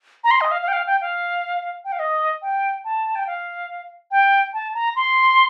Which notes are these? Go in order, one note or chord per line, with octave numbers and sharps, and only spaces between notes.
A#5
C6
D#5
F5
F5
G5
F5
G5
F5
G5
F5
D#5
G5
A5
G5
F5
G5
A5
A#5
C6